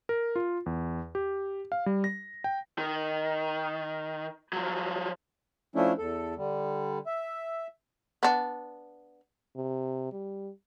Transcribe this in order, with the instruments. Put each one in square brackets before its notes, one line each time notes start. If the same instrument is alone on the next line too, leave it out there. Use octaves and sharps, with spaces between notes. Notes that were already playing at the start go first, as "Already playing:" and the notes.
[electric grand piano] A#4
F4
E2
G4
F5
G3
A#6
G5
[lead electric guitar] D#3
F3 F#3
[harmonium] F3 A3 C#4 D4 E4
E2 A4
D3 G3
E5
[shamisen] B3 D4
[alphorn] C3
G3